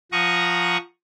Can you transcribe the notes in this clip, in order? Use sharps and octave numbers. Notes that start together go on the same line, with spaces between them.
F3 F#5 A#5 C#6 D#6